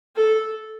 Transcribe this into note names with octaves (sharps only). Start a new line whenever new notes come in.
A4